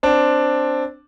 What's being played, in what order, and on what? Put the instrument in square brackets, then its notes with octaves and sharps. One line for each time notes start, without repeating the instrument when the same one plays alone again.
[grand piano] C4 D4